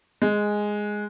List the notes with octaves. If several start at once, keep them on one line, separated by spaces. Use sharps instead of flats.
G#3